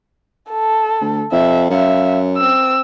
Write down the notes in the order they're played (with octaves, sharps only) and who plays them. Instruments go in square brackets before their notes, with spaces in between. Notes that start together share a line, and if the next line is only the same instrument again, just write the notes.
[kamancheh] A4
[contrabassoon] D2
[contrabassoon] F2 [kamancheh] E5
[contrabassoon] F#2 [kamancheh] E5 F5
[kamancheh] C4 E6